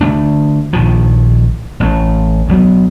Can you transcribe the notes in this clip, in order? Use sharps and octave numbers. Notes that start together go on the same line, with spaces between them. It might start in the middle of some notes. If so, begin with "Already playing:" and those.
D3 E3 A3 D4
A#1 D#3 F3
A1 A3
D2 F#3 B3